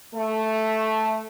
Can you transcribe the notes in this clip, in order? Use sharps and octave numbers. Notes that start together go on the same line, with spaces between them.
A3